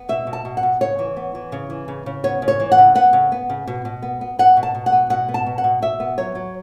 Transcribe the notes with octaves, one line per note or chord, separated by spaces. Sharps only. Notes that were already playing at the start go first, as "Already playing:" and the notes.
Already playing: B3
B2 E5
B2
A5
B2
F#5
B2
C#3 C#5
E3
B3
E3
C#3
E3
C#3
C#3
B3 C#5
C#3
C#5
E3
F#5
C#3
B3 F#5
C#3
B3
C#3
B2
B2
B3
B3
B3 F#5
B2
A5
B2
F#5
B3
B2 F#5
B3
A5
B2
F#5
B2
B2 E5
B3
F#3 C#5
F#3